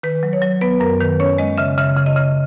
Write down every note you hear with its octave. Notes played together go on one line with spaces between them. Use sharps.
D#3 B4
F#3
C#5
F#3
B3 B4
F#2 A#4
D#3 B4
C#4 C#5
G#3 D#5
C#3 E5
C#3 E5
C#3
D#5
C#3